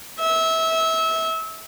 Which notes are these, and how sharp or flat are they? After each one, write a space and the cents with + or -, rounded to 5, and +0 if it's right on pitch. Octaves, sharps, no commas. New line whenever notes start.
E5 -25